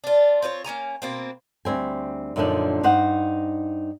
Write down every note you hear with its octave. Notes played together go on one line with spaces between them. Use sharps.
D4 F4
C4 F4 B4 C#5
A#3 C#4 G#5 A#5
B2 A#3 C4
D2 G3 C4 G#5
F#2 A#2 D3 F3 D4 D#4
G2 D#4 C5 F#5